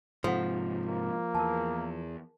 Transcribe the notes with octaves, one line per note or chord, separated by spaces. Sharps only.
G#2 C3 F3 A4 F#5
A#3
E2 A#4 A5